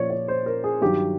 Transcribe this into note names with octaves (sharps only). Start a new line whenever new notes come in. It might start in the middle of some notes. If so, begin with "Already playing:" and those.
Already playing: A#2 F3 C#5 D5
C#5
C5
A#4
G#4
G2 D#3 F#3 G4